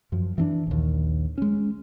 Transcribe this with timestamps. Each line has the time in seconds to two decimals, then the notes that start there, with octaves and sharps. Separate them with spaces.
0.12 F#2 F3
0.38 E3 C4 D4
0.67 A#1 D#2
1.38 G#3 C#4